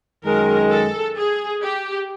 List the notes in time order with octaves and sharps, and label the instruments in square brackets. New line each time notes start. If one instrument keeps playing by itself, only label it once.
[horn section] F#2 D#3 G#3 [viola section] A#4
[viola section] A4
G#4
G4